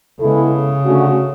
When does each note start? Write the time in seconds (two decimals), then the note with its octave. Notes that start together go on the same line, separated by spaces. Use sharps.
0.20 C#3 G#3 B3 E4 A4
0.85 D3 A3 C#4 F#4